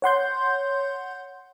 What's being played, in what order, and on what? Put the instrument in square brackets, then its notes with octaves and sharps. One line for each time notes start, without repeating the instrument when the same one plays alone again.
[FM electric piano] C#5 F#5 C6 G6